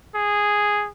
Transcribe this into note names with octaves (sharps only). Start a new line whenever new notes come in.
G#4